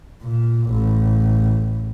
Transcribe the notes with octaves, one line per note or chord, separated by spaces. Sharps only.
A#2
A1